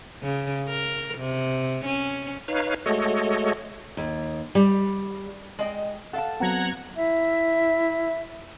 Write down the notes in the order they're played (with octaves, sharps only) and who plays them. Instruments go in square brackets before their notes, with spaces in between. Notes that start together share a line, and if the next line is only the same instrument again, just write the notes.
[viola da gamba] C#3
A#4
C3
C#4
[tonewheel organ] D#4 B4 C#5 F5
G#3 A3 F#4 A4 C#5 D#5
[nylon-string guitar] D#2
G3
[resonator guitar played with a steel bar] G#3 D#5 G5
[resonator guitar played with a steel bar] A4 F5 A5 [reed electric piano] F#5
[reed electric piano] F#3 B3 C4 [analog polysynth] F#5 A#5 G#6
[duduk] E4 [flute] E5